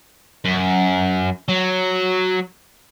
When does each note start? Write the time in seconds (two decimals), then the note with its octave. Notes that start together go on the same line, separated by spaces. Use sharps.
0.45 F#2
1.48 F#3